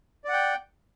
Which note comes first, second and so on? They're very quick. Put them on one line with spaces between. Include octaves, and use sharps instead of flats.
D5 F#5 G5